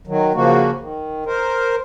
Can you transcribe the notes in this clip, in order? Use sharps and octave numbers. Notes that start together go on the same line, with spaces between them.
D#3 F#3
C#3 F3 A#3 F#4
D#3
A#4 C5